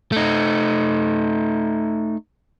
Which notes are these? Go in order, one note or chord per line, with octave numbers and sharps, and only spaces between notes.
A3 D#4